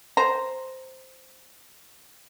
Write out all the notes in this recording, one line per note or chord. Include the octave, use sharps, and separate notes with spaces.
C5 A#5